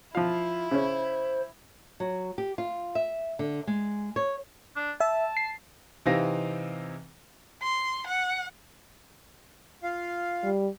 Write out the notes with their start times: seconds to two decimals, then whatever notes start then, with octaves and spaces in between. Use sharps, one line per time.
0.15 F3 E4 F4 F5
0.71 C#3 C#4 C5
2.00 F#3
2.38 G4
2.58 F4
2.95 E5
3.39 D3
3.67 G#3
4.16 C#5
4.76 D4
5.01 E5 A5
5.37 C7
6.06 C3 E3 C4 D#4 F5 A#6
7.63 C6
8.07 F#5
9.83 F4 F5
10.43 G3